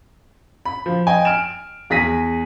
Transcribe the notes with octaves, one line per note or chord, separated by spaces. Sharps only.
B5
F3
D#5 G5 G#5
F6 D7 E7
E2 G#4 A#6 B6 D#7